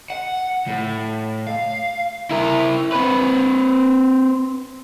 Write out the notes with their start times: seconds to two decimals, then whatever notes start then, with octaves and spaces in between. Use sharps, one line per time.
0.10 F#5
0.67 A2
1.47 F5
2.31 E4 A#4
2.92 C4 B4